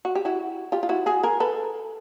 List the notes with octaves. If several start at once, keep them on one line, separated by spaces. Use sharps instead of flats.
F#4
G4
E4 F#4
F4 G4
F4
E4 F#4
F#4 G#4
G#4 A#4
A4 B4